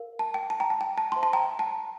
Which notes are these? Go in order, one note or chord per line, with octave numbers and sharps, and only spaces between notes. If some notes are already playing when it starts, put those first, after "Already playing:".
Already playing: A#4 F5
A5
G5
A5
G5 A#5
A5
G5
A5
C5 E5 G5 A5 C6
A5 C6
G5 A#5
G5
A5